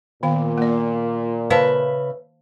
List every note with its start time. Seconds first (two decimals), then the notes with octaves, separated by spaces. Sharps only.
0.23 A#2 D#3 B3 F5
0.58 A#3 D5
1.50 C#3 B4 C5 E5 F5 A5